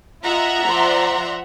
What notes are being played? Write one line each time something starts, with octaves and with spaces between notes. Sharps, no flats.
F4 D#5 E5 F#5 A#5
F3 D5 C6